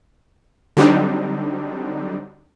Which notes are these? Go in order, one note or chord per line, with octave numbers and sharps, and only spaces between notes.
D3 F#3 G3 C4 D4 D#4